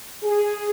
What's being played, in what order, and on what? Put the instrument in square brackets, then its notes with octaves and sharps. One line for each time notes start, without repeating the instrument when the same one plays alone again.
[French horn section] G#4